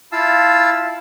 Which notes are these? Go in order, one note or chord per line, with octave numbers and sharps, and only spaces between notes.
E4 F4 F5 A5 E6